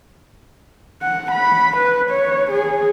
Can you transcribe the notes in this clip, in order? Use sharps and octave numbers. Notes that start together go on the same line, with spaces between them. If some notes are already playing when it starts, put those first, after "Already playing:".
F#5
B5
B4
C#5
G#4